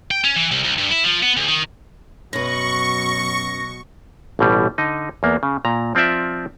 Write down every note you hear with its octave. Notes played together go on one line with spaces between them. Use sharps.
G5
C#4
E3
C2
C2
G2
E4
F3
B3
D2
D#3
F#2 B2 F#3 B4 C#6 A#6
A1 B2 G3
D3 D#4 D#5
E2 A#3 B3
C#3
A#2 A#5
F3 C4 F4 D5 E5